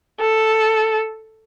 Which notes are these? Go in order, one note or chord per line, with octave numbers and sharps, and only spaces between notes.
A4